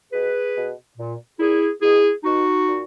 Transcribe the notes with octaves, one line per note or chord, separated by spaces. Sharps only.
B2 G#4 B4
B2
A#2
A#2 E4 G#4
B2 E4 G#4
B2 D#4 F#4
A#2